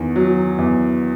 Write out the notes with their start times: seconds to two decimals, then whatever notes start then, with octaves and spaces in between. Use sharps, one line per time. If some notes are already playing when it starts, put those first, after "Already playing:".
Already playing: E2 D#3
0.16 F#3
0.58 E2